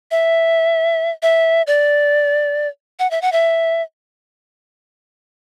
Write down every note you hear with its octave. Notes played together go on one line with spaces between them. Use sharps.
E5
E5
D5
F#5
E5
F#5
E5